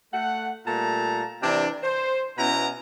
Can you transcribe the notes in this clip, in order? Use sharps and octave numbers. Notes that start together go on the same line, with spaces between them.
A3 F#5
A#2 G3 A3 A5 A#5
C3 E3 D4
C5
B2 B3 C#4 E4 A#5